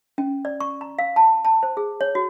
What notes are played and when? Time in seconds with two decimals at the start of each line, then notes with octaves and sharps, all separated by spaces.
0.18 C#4
0.45 D5
0.60 C#6
0.81 A#5
0.99 F5
1.16 A5
1.45 A5
1.63 C5
1.77 G#4
2.01 C#5
2.15 F#4